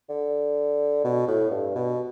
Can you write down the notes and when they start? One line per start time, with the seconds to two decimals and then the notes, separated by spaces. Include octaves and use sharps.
0.10 D3
1.04 B2
1.28 A2
1.51 G2
1.75 B2